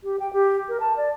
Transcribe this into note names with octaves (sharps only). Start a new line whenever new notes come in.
G4
G5
G4
A#4
A5
D5